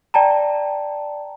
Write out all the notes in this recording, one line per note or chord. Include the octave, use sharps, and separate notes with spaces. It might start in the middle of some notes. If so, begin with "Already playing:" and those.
D5 G5 A5 A#5